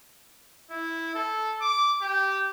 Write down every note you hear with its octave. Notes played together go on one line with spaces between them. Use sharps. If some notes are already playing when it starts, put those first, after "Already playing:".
E4
A4
D6
G4